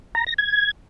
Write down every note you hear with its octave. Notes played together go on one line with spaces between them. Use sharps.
A#5
A#6
G#6